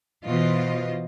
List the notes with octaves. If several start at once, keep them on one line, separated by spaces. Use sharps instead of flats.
B2 E3 F4 C5 D#5